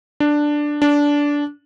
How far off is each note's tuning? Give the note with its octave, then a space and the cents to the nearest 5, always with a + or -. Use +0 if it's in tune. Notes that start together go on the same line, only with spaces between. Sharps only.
D4 +5
D4 -15